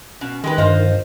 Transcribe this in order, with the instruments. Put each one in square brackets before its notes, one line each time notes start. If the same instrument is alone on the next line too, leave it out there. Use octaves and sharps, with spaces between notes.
[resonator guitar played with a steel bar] B2 [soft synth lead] C#4
[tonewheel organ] D#3 [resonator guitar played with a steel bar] G#3 G4 B4
[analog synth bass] G2 [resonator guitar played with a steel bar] F4 D#5 [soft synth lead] C5